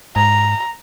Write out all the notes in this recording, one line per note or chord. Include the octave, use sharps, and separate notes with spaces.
G#2 A#5